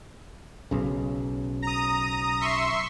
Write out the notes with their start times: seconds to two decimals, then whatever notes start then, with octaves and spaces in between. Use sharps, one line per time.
0.71 B1 C#3
1.62 A#5 D#6
2.41 E5 C6 C#6